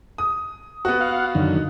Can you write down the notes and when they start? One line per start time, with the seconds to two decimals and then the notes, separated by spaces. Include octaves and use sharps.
0.18 D#6
0.85 B3 F#4
1.01 F5 F#5
1.35 F#2 D3 D#3